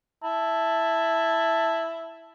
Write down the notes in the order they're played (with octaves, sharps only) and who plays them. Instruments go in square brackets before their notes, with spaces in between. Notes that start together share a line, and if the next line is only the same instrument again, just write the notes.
[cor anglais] E4 [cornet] A5